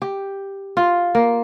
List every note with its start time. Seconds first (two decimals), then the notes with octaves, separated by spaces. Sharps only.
0.02 G4
0.77 F4
1.15 A#3